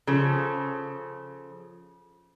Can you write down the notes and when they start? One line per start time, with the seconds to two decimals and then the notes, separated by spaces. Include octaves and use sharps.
0.07 C#3 F3 A4